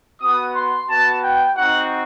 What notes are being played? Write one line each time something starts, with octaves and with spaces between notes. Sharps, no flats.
B3 F#4 D#6
C6
B3 F#4 A5
G5
C4 D#4 F#4 F#5